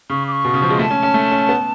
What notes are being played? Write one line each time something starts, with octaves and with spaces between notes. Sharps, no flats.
C#3 C#6
D6
C#6
B2
C#3
F3
G#3
A3 A5
C#4
C#4
A3
C#4
B3